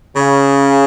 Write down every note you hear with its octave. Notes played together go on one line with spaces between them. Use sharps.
C#3